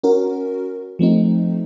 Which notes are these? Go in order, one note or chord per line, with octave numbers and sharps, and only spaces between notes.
C#4 F#4 A#4
F3 A3 C4 D#4